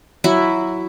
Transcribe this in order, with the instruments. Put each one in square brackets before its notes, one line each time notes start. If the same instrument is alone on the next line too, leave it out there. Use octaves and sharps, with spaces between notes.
[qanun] F#3 E4